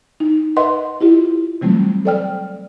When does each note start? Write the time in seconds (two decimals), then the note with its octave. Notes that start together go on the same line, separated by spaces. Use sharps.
0.20 D#4
0.56 A#4 B4 D#5 E5 F#5 C6
1.01 E4 F4 G4
1.61 C3 E3 F#3 G3 A3 C4
2.05 A4 C5 D5 G5 F6